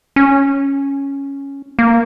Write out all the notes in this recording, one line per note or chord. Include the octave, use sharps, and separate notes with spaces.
C#4
A#3